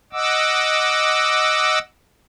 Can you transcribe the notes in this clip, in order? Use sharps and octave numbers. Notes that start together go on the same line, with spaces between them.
D#5 F#5 D6 E6